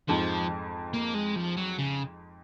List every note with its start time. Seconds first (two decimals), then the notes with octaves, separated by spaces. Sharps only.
0.09 F2 G#2 F3
0.94 A#3
1.14 G#3
1.36 F3
1.57 F#3
1.78 C#3